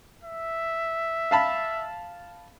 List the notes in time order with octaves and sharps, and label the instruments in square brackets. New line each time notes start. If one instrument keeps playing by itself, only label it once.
[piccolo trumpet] E5
[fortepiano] F5 A5 B5